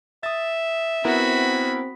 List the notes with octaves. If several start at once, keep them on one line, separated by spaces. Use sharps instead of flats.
E5 D#6 A6
B3 C4 E4 F#4 A#4 B5